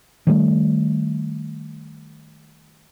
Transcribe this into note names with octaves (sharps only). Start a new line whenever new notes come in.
D#3 G3 A3